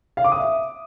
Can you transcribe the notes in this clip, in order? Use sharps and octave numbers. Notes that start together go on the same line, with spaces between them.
F5
D6
D#6
E5